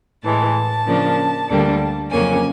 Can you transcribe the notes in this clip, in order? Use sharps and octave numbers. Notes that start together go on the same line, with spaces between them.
A2 E3 G#3 A5
C#3 F3 A#3 D4
D2 D3 G3 A#3 D4
F2 C#3 F#3 A#3 C#4 G#5